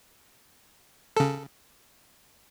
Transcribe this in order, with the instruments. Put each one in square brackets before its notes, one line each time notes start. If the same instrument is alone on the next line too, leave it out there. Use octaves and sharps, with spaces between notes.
[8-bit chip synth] C#3 A4